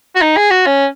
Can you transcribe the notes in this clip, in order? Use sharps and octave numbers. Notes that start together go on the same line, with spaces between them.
F#4
D#4
G#4
F#4
C#4